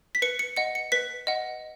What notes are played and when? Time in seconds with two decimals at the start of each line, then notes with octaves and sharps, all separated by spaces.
0.15 B6
0.22 B4 C#7
0.39 C#7
0.56 D#5 F#5 C#7
0.75 C#7
0.92 B4 B6
1.27 D#5 F#5